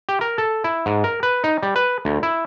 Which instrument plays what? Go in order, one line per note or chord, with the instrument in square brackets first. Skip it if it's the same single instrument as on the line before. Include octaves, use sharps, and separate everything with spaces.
[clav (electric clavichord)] G4
A#4
A4
E4
G#2
A#4
B4
D#4
G3
B4
D2
E4